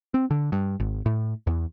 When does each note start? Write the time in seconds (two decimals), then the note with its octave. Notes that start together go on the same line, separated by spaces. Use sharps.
0.14 C4
0.31 D3
0.52 G2
0.80 G#1
1.06 A2
1.47 E2